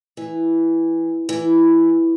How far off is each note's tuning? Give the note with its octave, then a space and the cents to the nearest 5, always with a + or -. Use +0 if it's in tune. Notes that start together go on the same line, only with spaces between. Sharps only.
E3 +0
E3 +5